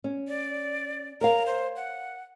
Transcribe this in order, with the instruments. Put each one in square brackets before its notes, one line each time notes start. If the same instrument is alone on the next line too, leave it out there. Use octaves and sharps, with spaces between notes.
[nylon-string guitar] C#4
[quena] D5
[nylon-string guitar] A#4 C#5 F5 [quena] A#5
[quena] C5
F#5